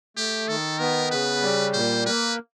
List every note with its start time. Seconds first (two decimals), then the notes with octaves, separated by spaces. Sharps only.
0.17 A3 G4
0.48 D#3 A4
0.79 B3 A#4
1.11 C#3 B4
1.42 G3
1.73 A#2 C5
2.06 A#3 B4